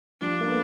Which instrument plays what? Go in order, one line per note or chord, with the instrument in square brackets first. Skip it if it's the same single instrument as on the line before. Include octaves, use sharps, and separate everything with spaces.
[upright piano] F3 G3 [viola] D4
[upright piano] A#3
A3 B3